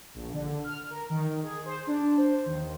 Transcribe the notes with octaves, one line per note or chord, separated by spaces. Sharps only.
A#1
D3
F6
A#4
D#3
G#4
C5
D4
C5
D#2